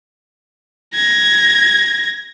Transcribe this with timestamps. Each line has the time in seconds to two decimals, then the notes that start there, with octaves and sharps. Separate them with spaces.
0.95 G#6 A#6